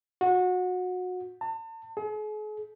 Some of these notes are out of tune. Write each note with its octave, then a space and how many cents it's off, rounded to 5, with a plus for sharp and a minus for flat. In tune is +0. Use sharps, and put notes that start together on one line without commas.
F#4 -25
A5 +40
G#4 +45